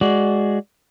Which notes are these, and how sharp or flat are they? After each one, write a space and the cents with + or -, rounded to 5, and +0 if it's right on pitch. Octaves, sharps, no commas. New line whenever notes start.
G#3 +0 F#4 +0 D5 -10